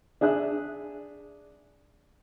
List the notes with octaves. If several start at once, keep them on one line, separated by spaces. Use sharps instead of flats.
D4 G#4 E5 F#6